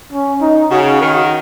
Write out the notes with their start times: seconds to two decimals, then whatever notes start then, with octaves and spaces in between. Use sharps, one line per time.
0.12 C#4
0.41 D#4
0.71 C#3 F#4
1.00 D#3